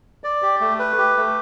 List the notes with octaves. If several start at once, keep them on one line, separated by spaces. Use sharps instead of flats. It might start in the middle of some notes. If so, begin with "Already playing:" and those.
D5
G4
A3
B4
G4
A3